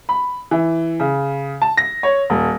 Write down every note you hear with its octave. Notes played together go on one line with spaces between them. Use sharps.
B5
E3
C#3
A5
A#6
C#5
D#1